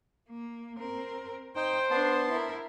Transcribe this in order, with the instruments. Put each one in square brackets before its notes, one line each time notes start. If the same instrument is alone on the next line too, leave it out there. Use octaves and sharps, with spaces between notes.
[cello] A#3
C4 A#4
[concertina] D#4 [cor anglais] C5 [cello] G5
[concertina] B3 A5 C6 [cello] D4
[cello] E4 A#4